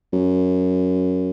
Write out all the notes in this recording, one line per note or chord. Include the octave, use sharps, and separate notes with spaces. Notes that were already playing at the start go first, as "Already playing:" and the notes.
F#2